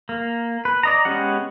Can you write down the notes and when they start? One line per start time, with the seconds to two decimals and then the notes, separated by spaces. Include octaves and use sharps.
0.09 A#3
0.65 B4
0.83 D5 D#5 A#5
1.05 G#3 B3 C#4 G4 F#5